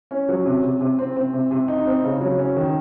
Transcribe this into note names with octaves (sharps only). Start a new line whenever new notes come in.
C#4
F#3
C3
C3
C3
C4
C4
C3
C3
D#4
C4
C#3
F#3
C#4
D#3